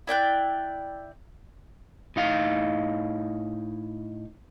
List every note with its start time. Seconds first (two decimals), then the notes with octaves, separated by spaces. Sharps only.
0.07 E4 D5 G5 F#6
2.16 A2 D#4 F5